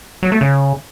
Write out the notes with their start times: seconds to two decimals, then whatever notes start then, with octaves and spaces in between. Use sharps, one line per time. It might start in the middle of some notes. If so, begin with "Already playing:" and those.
0.23 F#3
0.32 A3
0.41 C#3